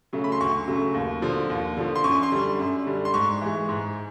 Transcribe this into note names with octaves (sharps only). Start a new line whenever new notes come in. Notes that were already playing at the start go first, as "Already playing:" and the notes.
C#3 F#3 A3
B5
C6
D2 C#6
C#3 F#3 A3
D#2
D3 F3
D#2
D3 F3
C6
F#2 C#6
C6
D3 G3
F#2
D3 G3
C6
G#2 C#6
E3 G#3
G#2